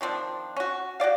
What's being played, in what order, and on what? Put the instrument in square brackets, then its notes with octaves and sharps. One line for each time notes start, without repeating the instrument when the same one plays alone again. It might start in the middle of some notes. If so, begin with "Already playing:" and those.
[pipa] D#3 F3 C4 D4
C#4 F#4
F#4 G4 D5 F5